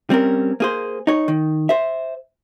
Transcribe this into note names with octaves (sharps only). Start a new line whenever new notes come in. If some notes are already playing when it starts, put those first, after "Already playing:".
G3 C4 C#4 A#4
A#3 G#4 C5
D#4 C#5
D#3
C5 E5